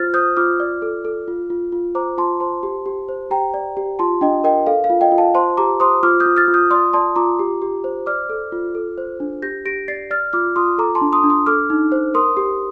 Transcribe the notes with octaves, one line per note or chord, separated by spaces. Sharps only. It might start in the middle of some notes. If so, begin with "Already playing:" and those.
Already playing: F4 C5 F6 A6
C5 D#6 G6
F4 D6 F6
D5
A4
A4
F4
F4
F4
C5 A#5 D6
F4 A5 C6
C5 A5 C6
G4
G4
C5
G4 G5 A#5
D5
G4
F4 A5 C6
D4 D#5 G5
A#4 D#5 G5
A4 F5
F5
F4
D#5 G5
F4
F5 A5
C5 A5 C6
G4 A#5 D6
C5 C6 D#6
F4 D6 F6
D#6 G6
F4
F6 A6
F4
D#6 G6
D5 C6 D#6
D5 A5 C6
F4 A#5 D6
G4
G4
C5
D5 D6 F6
A4
F4
A4
C5
D4
G4 G6 A#6
G4 A#6 D7
D5 A6 C7
D5 F6 A6
F4 D6 F6
F4 C6 D#6
A4 A#5 D6
A5 C6
D4
C6 D#6
D4
C6 D#6
A4 D6 F6
D#4
C5
A#4 C6 D#6
G4